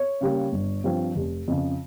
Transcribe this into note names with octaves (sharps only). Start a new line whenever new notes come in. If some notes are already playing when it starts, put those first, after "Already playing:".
Already playing: C#5
C#3 G3 A#3
G1
G2 F3 C4
F1
F2 C#3